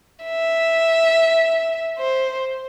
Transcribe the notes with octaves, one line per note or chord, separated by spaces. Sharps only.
E5
C5